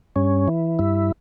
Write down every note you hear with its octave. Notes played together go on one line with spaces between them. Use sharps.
G2 C#4
E3
G2 E4